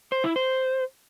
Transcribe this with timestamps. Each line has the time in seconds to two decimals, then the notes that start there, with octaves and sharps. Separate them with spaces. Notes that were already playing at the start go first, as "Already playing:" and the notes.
0.12 C5
0.24 E4
0.36 C5